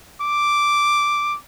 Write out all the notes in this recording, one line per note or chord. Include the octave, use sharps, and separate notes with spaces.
D6